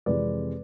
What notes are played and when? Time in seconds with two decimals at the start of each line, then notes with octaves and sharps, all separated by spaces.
0.06 F2 C3 E3 G#3 B4 D5